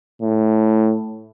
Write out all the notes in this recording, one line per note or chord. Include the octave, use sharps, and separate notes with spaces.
A2